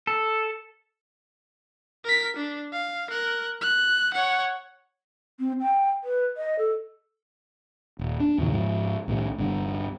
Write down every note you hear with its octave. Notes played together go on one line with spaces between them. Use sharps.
A4
A#4 B6
D4
F5
A#4 F#6
F#6
C#5 F#5
C4
G5
B4
D#5
A4
D#1
D4
E2 A#2 C#3 E3
G#2 F3
C2 A2 C3 D#3
G1 C2 G2 D3